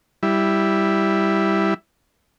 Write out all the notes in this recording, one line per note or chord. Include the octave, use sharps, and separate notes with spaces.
G3 E4